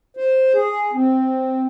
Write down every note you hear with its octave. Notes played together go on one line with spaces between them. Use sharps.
C5
G#4
C4